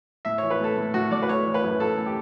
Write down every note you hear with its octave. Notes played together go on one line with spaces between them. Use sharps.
A2 E5
E3 C#5
B4
A3 A4
A2
A2 F#4
A2 D5
B4
A3 C#5
E3
B4
F#2
F#2 A4
A3
G4